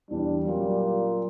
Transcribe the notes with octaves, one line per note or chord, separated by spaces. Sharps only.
E2 G3 D4
A#2 F#3 C#4